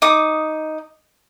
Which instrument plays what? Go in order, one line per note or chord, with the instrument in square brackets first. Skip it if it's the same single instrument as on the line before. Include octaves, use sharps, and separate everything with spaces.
[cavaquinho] D#4 D6 D#6